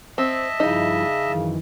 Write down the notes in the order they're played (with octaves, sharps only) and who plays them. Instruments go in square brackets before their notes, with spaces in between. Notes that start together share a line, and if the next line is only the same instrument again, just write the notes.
[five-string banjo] C4 [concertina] D#5 E5 A5
[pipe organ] G2 F3 E4 [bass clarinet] C#3 [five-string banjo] D#4
[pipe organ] F#2 D#3 E3